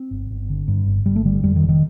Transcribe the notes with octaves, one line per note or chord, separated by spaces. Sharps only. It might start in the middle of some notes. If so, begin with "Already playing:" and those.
Already playing: C4
G1
G1
D3
G2
G1
G1 G3
A3
D3 G3
F2 G3
D#3
F1
D#3